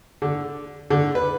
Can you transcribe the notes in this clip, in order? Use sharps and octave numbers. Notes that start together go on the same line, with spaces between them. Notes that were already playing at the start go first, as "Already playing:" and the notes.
D3
D3
B4